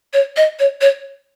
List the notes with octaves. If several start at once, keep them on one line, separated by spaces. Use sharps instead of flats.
C#5
D#5
C#5
C#5